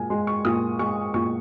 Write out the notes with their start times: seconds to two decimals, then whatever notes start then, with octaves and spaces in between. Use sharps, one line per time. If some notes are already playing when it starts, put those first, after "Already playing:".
Already playing: A#2 G#3 G#5
0.10 G#3 C6
0.27 C#6
0.45 A#2 D#6
0.79 G#3 C#6
1.14 A#2 C#6